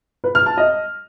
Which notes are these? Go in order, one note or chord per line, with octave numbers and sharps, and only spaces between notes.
B4
F6
A5
D#5